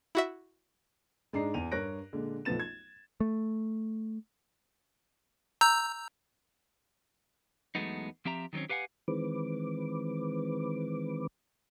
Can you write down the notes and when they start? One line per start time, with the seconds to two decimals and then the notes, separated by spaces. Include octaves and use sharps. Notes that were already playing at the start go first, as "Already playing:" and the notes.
0.15 E4 F#4 E5
1.33 G#2 G#3 D4 D#5 A#5 C7
1.54 E2 D#7 F7
1.71 G2 A#4 C#5 F#6 A#6 D7
2.13 A#2 D3 G#3
2.45 B1 F3 A3 B3 A6 E7
2.59 G#6
3.20 A3
5.61 A#5 E6 G6
7.75 E2 F#3 G#3 A3 B3 D#4
8.25 F3 C4 G4 E5 A#5
8.53 D#3 F#3 A3 C4 C#4
8.69 G4 B4 F5 F#5 G#5
9.08 D#3 E3 G#3 C4 B4 D6